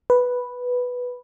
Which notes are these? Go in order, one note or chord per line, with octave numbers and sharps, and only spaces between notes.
B4